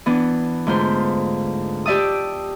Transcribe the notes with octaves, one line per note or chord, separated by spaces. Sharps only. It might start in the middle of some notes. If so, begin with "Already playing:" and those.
E3 B3 D4
D2 G#2 F4 B4 C5
G4 D5 E5 A5 D#6